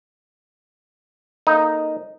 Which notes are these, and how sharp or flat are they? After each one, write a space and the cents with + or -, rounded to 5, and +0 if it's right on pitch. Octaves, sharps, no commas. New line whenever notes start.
A#3 +0 D#4 +0 A4 +0